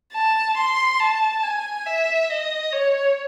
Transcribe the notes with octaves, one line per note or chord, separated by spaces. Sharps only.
A5
C6
A5
G#5
E5
D#5
C#5